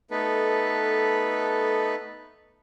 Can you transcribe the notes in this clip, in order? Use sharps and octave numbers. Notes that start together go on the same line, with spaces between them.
A3 B3 D#4 A4 B4